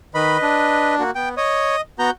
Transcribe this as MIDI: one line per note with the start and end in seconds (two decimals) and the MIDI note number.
0.15 0.38 51
0.15 0.95 71
0.15 0.95 75
0.15 0.38 83
0.42 1.03 62
0.99 1.11 58
0.99 1.11 66
1.15 1.35 59
1.15 1.29 79
1.37 1.76 73
1.37 1.81 75
1.37 1.81 87
1.99 2.10 59
1.99 2.11 66
1.99 2.10 82
1.99 2.11 91